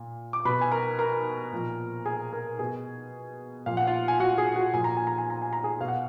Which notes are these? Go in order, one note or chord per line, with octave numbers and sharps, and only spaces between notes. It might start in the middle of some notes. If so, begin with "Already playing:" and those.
Already playing: A#2
D6
B2 B4 B5
G#5
A#4 A#5
A#4 A#5
A#2 F3
G#4 G#5
A#4 A#5
B2 G#4 G#5
A#2 F3 F5
F#5
F4 F5
G#5
F#4 F#5
G#4 G#5
F#4 F#5
A#2 F3 G#5
A#5
G#5
A#5
G#5
A#5
G#5
A#5
G#4 G#5
B2 F5
F#5